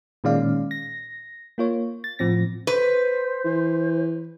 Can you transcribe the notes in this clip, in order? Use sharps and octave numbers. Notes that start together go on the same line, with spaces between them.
A#2 D#3 G#3 C#4 D5 F5
A#6
A#3 F4 C#5
A6
A2 F3 C4 A#6
B4 C5
E3